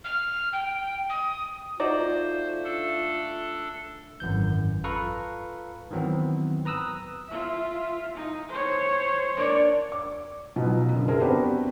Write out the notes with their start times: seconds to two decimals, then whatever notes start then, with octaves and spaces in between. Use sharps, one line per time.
0.05 F6
0.53 G5
1.10 D#6
1.80 A3 D#4 F4 F#4 C5 D5
2.64 D4 A4
4.20 G#1 F#2 E3 G6
4.84 F4 A4 B4 F5 A#5 C#6
5.91 D#3 E3 F#3 B3 C4
6.65 B4 A#5 D#6 E6 F#6
7.28 F4 E5
8.15 D#4
8.49 C5 C#5
9.37 A#3 D4 F4 C#5 D5
9.92 D6
10.56 B2 F3 F#3 D#4 B4
10.93 F#2 D3
11.08 G#4 A#4 C5 E5 A5 A#5
11.21 B3 C4 D4 F#4 G4 B4